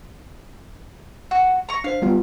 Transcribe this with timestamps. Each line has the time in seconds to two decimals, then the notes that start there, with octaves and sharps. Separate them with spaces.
1.31 F#4
1.69 A#5 C#6
1.84 D4 C5 F5
2.02 G3 B3 F4